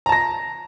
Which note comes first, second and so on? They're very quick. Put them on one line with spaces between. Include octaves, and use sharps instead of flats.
A#5 A5 A#6